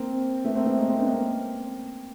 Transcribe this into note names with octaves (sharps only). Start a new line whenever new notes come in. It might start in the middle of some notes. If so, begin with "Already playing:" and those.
Already playing: A#3 C4
A3 B3
A#3 C4
A3 B3
G#3 A#3
A#3 C4
B3 C#4
A#3 C4